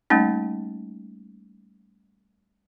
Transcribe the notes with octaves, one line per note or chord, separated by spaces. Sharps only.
G3 A3 A#3 C#4 D#4